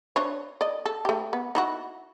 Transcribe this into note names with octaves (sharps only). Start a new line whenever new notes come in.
D4 C5 C#5
D5 D#5
A4
A3 G4
B3
D#4 E4 F#4